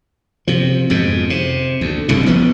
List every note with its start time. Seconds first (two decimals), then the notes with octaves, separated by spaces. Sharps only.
0.48 C3 F3
0.90 F2 G#2 B2
1.30 C3
1.81 D2
2.09 F#1 C2 C3
2.26 A1 F3 B3